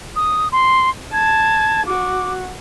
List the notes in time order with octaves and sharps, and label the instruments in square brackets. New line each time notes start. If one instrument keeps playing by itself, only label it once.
[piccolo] D#6
C6
[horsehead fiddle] A5 [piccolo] G#6
[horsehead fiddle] F#4 [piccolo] D6